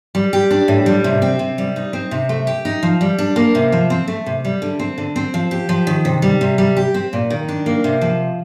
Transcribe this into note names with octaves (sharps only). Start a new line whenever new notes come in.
G3
G4
D4
A2
G3
C3
C4
C3
G3
D#4
C4
C3
A3
G4
D#4
F3
G3
D4
A#3
C3
F3
C4
A3
C3
G3
D3
C4
D3
C4
F3
G4
F3
D#3
C3
G3
C3
G3
G4
C4
A#2
D#3
D4
A#3
C3
F3